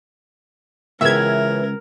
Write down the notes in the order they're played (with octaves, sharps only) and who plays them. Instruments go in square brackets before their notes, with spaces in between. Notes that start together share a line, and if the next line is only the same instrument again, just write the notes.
[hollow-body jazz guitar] C#2 [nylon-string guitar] C#3 E3 B3 [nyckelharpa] A#4 [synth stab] E5 G#6